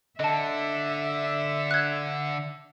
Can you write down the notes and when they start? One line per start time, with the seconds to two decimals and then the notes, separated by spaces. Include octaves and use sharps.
0.20 D3 D#5 E5 A5
1.71 F#6 G#6